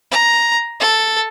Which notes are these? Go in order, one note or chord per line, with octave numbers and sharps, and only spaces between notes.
A#5
A4